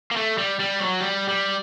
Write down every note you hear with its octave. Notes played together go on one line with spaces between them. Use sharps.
A#3
A3
G3
G3
F#3
G3
G3